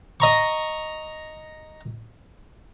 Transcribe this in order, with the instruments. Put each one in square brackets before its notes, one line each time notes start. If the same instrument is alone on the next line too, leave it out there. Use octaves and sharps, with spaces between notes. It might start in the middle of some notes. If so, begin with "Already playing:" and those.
[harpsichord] D#5 A#5 C#6